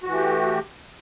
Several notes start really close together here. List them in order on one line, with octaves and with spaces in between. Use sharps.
F#4 E3 A3 G4